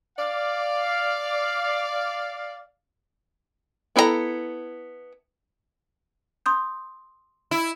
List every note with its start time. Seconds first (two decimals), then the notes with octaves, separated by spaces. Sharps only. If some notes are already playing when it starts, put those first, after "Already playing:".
0.18 D5 F5
3.96 B3 E4 A4 D5 A#5
6.46 C6 D#6 G6
7.51 E4